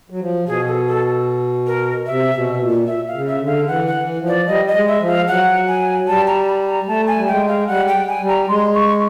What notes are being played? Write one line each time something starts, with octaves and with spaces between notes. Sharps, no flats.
F#3
F3
B2 G#4
A4
A4
A#4
C3 E5
B2
A#2
E5
F5
C#3
E5
D3
F5
E3 F#5
F#5
E3
F3
D5
G3 D#5
D#5
G#3
E5
F3
F5
F#3 F#5
G#5
G3 A5
A#5
B5
A#5
A3 A5
G#5
G3
G#3 G5
F5
G3 F#5
G5
G#5
G3
A#5
G#3 C6
C#6